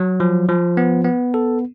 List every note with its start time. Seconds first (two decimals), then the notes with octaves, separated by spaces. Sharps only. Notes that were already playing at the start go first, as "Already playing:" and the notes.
Already playing: F#3
0.20 F3
0.49 F3
0.77 B3
1.04 B3
1.34 A4